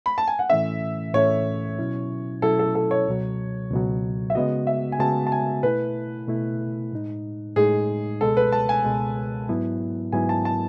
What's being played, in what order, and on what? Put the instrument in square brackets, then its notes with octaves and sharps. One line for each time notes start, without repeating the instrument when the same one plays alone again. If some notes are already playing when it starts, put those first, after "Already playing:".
[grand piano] B5
A5
G#5
F#5
[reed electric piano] A2 E3 A3 C#4 [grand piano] E5
[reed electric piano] A2 E3 A3 C#4 [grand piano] C#5
[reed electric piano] B2 F#3 C#4 E4
[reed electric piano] B2 F#3 C#4 E4 [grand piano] A4
[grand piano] A4
A4
C#5
[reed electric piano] C#2 B2 F#3
C#2 B2 F#3
[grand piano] E5
[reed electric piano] C#3 G#3 B3 F#4 [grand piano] D#5
[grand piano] E5
G#5
[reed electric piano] C#3 G#3 B3 F#4 [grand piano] A5
[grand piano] A5
G#5
[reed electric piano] B2 A3 E4 [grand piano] B4
[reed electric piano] B2 A3 E4
A2 G#3 D#4
[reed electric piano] A2 G#3 D#4 [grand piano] G#4
[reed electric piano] C#2 B2 G#3 [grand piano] A4
[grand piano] B4
A5
G#5
[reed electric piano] C#2 B2 G#3
G#2 F#3 B3 E4
[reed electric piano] G#2 F#3 B3 E4 [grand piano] G#5
[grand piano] A5
A5